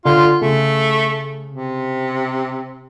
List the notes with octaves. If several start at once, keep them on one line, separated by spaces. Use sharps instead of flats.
D3 F4 C6
C#3 A3
C3